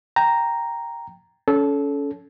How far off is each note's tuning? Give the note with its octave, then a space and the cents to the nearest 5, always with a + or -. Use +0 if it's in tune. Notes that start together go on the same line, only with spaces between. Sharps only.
G5 +0 A#5 +0
C#4 +25 A4 -20